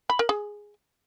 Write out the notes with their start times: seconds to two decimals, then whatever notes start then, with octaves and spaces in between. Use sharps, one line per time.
0.10 B5
0.19 A#4
0.29 G#4